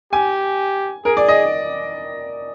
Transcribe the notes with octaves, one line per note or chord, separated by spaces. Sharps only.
G4 G#5
G#4 A#4
D5
D#5